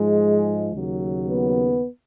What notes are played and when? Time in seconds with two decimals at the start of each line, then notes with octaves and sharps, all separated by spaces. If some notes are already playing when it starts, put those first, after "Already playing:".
Already playing: G#2 F3 G#3
0.72 D#2 C#3 F#3
1.29 B3